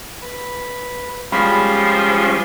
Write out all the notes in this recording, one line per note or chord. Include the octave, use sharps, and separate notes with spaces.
B4
F3 G3 G#3 C#4 B5 B6